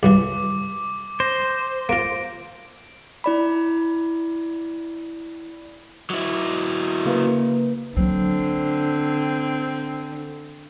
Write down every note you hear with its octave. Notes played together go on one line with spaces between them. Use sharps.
C2 F#2 E3 D6
C5 A#6
A#3 F4 A#6 D7
E4 D5 B5
F#3 E4
C#3 A#3 B4
D3 F#3 A#3 C4